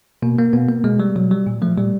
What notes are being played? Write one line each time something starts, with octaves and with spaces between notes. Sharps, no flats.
B2 A#3
A#3
B2 B3
A#3
B2 G#3
G3
B2 F#3
G3
A#2
F3 A3
A#2 G3